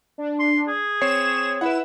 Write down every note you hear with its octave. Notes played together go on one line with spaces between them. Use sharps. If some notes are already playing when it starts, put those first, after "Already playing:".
D4
C6
G#4
C4 C#5 C7 E7
E4 B4 E5 F#5 E7